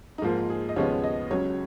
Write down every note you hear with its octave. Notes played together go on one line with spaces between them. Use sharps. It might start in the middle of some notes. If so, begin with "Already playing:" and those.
D#4
G#2 F3 A#3 F4
G#4
D#5
D#2 C#3 F3 G#3 B3 C#5
D#5
C#2 C#3 F#3 C#5